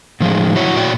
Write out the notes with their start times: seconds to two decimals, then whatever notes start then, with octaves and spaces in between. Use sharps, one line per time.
0.20 A2 D#3 F3 G#3
0.56 E4 F#4 C#5
0.77 A#2 F#4 C#5 D5 G5